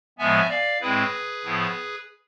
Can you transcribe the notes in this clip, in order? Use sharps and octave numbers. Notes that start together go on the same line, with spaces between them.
A2 F3 G#3 B3 E5 G#5
D5 F5
A2 G#3 C4 E4 G#4 B4
A2 F3 B3 E4